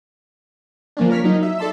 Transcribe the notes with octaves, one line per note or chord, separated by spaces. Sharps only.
F3 A#3 C#4 D4
A#4 C#5 F6 B6
F#3 D#4
E5
A4 D5 A5 C6 E6